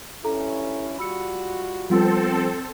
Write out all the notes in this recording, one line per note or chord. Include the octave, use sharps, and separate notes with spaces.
G2 C#4 E4 A4 A#5
G3 F4 F#4 B5 E6 C#7
F3 G3 B3 C4 F4 A4 F#5